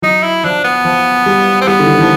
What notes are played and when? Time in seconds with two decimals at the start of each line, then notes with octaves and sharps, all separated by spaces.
0.02 F#3 D#4
0.23 E4
0.44 F3 D4
0.64 B3
0.85 F3
1.26 G3
1.61 C4
1.67 G3 B3
1.79 D3
1.86 D#3
1.94 E3
2.01 F3